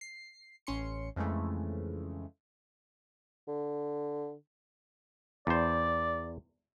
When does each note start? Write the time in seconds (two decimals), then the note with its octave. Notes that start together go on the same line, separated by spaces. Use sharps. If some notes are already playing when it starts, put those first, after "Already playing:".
0.01 C7
0.67 A1 C#4 C6 C#7
1.16 F2 C#3 E3 G#3 A3
3.48 D3
5.47 E2 C5 D5